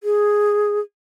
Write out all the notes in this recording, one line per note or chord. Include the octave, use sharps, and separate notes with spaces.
G#4